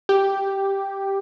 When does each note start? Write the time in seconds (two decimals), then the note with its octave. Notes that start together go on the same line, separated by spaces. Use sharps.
0.09 G4